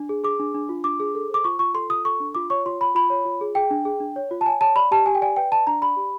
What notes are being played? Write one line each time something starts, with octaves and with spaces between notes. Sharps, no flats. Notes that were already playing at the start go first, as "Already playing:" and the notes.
Already playing: D4
G#4
G#4 D6
D4
D4
F4
D4 D6
G#4
A4
C5 D6
F4 C#6
F4 C#6
A4 C6
F4 D#6
A4 C#6
D4
F4 D6
C#5 C#6
F4 C6
F4 B5
F4 B5
C#5
F4
G#4
G#4 G5
D4
G#4
D4
C#5
F4
A5
C#5 G#5
C#5 A5
D5 B5
G4 A5
G4 G#5
G5
D5 G#5
B4 G5
D5 A5
D4 A#5
D5 B5
G4